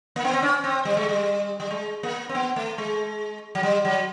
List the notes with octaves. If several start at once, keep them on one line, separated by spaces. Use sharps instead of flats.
A#3
B3
C4
C#4
C4
G3
G#3
G3
G3
G#3
A#3
C4
B3
A3
G#3
F#3
G3
F#3